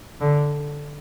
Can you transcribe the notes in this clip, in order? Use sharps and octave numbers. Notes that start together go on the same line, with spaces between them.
D3